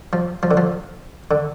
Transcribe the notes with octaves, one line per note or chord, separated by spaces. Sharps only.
F3
F3
D3
F3
D3